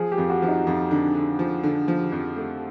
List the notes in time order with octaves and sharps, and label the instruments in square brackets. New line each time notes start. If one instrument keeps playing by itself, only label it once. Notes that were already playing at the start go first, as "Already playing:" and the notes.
Already playing: [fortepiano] F3 [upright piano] G#4
[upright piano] G4
[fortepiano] F2
[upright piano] F#4
[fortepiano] F3
[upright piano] D#4
[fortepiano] F2
D3
D3
F3
D3
F3
F2
A3